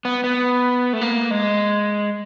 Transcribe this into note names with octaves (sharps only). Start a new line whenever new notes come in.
B3
B3
A3
A#3
G#3